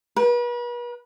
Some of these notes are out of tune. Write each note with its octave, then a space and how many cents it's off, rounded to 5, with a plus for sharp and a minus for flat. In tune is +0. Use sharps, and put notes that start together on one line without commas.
B4 -40